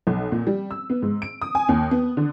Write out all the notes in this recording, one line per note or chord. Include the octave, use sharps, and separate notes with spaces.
B1
A#2
G3
E6
B3
G#2
D7
D#6
G#5
D#2
B3
D3